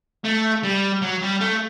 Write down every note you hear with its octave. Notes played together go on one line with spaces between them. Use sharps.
A3
G3
F#3
G3
A3